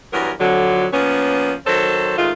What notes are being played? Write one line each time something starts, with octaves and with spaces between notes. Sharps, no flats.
G2 E3 F#3 B3 A#4
F2 D3 F#3
F3 A#3 B3 C#4
D#3 F#3 C4 A4 C5 C#5
G#2 D#3 G#3 A3 F4